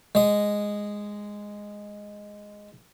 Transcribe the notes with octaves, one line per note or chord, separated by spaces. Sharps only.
G#3 D#5